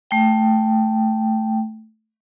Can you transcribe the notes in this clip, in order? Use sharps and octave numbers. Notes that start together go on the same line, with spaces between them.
A3 G5